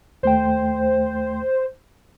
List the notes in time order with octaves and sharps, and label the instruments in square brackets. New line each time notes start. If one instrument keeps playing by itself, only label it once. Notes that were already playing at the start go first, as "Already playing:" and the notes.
[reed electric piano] D#2 A3 G5 [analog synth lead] C5